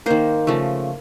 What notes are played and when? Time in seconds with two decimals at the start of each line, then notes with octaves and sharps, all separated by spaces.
0.06 D#3 A#3 C5
0.47 C#3 F3 A3